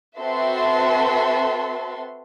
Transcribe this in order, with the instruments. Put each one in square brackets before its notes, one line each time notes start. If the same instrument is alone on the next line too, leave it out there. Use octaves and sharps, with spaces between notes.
[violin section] C4 F#4 A4 B4 E5 C6